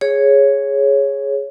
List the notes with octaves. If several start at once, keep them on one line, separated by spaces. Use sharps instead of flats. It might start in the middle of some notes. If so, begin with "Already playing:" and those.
G#4 C#5